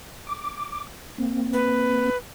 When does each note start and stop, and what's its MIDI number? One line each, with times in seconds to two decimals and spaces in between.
0.27 0.87 86
1.18 2.10 58
1.18 2.10 60
1.53 2.17 71